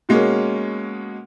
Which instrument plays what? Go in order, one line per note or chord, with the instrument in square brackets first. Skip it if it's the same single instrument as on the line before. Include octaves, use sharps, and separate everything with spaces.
[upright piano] B2 G#3 A#3 C#4